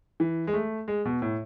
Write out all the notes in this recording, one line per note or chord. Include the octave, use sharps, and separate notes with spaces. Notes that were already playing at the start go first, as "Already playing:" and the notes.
E3
G#3
A3
G#3
B2
A2